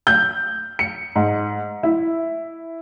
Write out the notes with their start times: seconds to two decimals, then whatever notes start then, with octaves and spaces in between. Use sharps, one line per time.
0.07 G6
0.79 C#7
1.15 G#2
1.83 E4